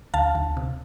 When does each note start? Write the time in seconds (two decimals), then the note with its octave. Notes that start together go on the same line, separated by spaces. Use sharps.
0.14 D2 F5 A5
0.35 D2
0.57 C3